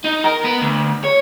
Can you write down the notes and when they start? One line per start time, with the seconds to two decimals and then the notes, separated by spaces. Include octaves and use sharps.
0.04 D#4
0.24 A#4
0.44 B3
0.62 D2
1.04 C#5